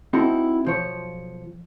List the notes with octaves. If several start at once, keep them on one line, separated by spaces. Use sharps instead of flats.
C4 D#4 E4 F#4 A4
B1 F3 C#5